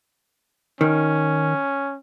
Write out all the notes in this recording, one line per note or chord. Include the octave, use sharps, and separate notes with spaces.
D#3 C#4